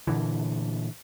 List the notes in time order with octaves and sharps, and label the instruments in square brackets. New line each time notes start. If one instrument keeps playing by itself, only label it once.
[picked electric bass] A#2 D3 E3